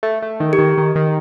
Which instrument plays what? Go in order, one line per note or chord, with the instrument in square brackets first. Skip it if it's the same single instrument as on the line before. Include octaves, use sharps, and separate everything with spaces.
[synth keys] A3
A3
D#3
[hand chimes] G4
[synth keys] D#3
D#3
D#3